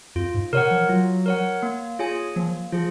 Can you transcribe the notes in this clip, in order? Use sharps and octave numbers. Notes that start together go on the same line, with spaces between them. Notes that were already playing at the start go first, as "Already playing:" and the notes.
F2 F4
G#2
C3 A#4 C#5 F#5
F3
F#3 F4
A#4 C#5 F#5
A#3
F4 G#4 C#5 G#5
F3 A#3
F3 F4 G#4